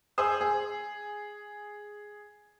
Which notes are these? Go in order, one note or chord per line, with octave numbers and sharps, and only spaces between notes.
G#4 C5 D#6 E6
G#4